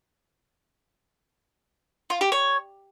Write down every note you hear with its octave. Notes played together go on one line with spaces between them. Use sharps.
F4
G4
C#5